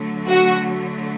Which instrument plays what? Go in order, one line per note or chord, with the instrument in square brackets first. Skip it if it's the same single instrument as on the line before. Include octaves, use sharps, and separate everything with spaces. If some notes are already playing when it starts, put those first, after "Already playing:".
Already playing: [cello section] D3 F#3 A3
[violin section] F#4